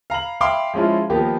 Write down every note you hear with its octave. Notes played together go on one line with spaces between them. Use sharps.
F5 A#5 B5 F#7
E5 F5 G5 B5 C6 D6
F3 G#3 C#4 E4 F4
D#3 F3 A#3 B3 G4